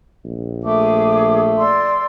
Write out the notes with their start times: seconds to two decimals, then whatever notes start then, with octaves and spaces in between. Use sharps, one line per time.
0.25 A#1
0.64 A3 G#4 D6
1.58 D5 C6 E6